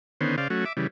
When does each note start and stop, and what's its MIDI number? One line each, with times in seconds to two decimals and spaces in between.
0.21 0.36 50
0.21 0.36 51
0.21 0.36 59
0.21 0.36 61
0.21 0.36 72
0.38 0.48 49
0.38 0.48 72
0.38 0.48 74
0.38 0.48 77
0.50 0.65 54
0.50 0.65 57
0.50 0.65 61
0.50 0.65 66
0.65 0.73 76
0.65 0.73 86
0.77 0.87 49
0.77 0.87 52
0.77 0.87 55